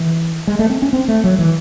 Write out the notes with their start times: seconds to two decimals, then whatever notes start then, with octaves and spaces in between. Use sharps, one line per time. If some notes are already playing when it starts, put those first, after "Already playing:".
Already playing: E3
0.47 G#3
0.59 A3
0.70 C4
0.82 C#4
0.93 C4
1.08 A3
1.24 F#3
1.38 E3